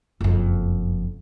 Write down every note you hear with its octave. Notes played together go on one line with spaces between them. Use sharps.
F#1 F2